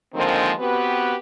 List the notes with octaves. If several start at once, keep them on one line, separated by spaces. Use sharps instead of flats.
D3 D#3 F3 G#3 A#3 C4
B3 C4 F#4 G4 B4